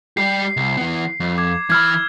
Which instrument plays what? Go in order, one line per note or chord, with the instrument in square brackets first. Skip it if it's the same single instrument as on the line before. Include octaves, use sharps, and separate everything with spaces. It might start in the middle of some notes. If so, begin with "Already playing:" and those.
[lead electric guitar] G3 G4 [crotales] C7
[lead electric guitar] C2
E3 B3
F2
[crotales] D6 G#6
[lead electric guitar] E3 B5 [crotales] E6 F6 G#6